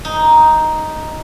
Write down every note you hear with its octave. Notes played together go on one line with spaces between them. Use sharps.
D#4